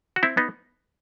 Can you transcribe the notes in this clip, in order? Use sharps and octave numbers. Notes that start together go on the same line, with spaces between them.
F#4
C4 E4
B3 D#4